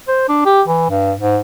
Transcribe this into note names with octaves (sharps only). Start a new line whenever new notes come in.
C5
D4
G4
E3
G2
G#2